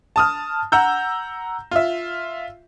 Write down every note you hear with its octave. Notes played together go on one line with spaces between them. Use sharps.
A5 D#6 F6
F#5 A#5 E6 G6
F4 E5